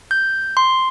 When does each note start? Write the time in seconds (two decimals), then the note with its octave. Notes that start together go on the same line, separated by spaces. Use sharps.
0.11 G6
0.57 C6